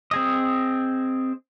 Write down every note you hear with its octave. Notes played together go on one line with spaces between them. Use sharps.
C4 G#4 D#5